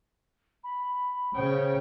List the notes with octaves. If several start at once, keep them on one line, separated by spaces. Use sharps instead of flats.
B5
C#3 C5 C#5 G5